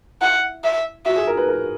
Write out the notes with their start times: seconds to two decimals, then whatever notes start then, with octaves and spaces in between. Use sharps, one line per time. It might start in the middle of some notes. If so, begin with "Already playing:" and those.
0.21 E4 F#5
0.64 E5
1.06 F#4 E5
1.16 G#4
1.27 A#4
1.37 B4
1.48 A#4